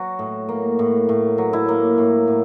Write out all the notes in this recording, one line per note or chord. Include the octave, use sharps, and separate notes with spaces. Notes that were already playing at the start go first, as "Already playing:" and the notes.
Already playing: F#3 F#4
A2
A#3
A2
A2
F#3
E4
A#3
A2
A2